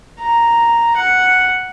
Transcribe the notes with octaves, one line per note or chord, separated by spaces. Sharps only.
A#5
F#5